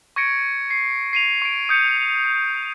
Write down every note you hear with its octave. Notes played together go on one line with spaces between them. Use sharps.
C#6 G#6 A#6 C#7 D7
C7
C7 D#7 F7
C#6 D7
D#6 G6 C#7